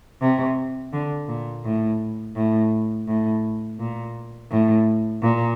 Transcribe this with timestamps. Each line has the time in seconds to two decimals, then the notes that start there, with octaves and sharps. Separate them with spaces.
0.21 C3
0.93 D3
1.28 A#2
1.64 A2
2.36 A2
3.07 A2
3.79 A#2
4.51 A2
5.22 A#2